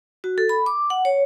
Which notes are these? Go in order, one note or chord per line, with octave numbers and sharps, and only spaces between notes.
F#4
A4
B5
D6
F#5
C#5